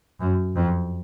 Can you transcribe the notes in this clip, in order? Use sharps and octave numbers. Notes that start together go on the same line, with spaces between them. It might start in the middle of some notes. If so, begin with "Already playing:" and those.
F#2
F2